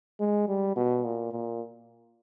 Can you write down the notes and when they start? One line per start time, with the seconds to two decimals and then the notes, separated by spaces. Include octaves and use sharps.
0.20 G#3
0.48 G3
0.76 B2
1.04 A#2
1.32 A#2